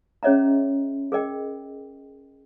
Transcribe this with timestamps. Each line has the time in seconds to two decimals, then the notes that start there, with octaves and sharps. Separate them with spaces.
0.23 C#4 G#4 C#5 D#5 E5 A#5
1.12 G#4 A#4 D#5 G5